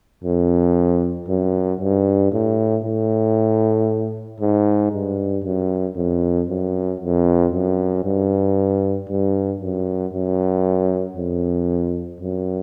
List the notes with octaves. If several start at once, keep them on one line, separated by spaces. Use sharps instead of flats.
F2
F#2
G2
A2
A2
G#2
G2
F#2
F2
F#2
F2
F#2
G2
G2
F#2
F#2
F2
F#2